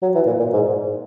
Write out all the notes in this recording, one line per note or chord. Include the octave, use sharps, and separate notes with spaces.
F#3
E3
A#2
A#2
G#2